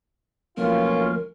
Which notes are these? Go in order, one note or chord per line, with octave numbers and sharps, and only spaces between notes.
B1 F3 A3 A#3 C#4 F4 A#4